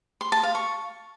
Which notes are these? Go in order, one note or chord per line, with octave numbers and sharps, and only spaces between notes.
C6
A5
F5
C#6